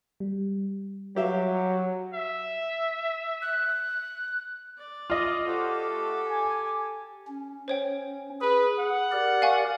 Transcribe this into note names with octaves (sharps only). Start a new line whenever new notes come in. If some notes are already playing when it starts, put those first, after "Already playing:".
G3
F#3 G4 E5 F5
E5
F#6
D5
F4 D#5 D6
F#4 G4 A4 C5 D5
A3 F#4
G#5
C#4
C5 C#5 G5
G#4 B4
F#5
G4 A#4 D5
F5 G#5 C#6